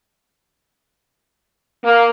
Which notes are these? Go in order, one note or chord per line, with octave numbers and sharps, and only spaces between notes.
A#3